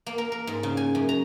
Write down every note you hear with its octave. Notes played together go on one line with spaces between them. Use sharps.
A#3
A#4
A#4
G#2
C#3
G#5
F#2
A#5